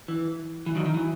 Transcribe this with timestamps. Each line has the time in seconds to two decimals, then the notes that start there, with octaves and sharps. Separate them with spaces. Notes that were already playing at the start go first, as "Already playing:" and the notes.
0.08 E3
0.66 E3
0.76 D#3 F#3
0.86 D#3
0.94 E3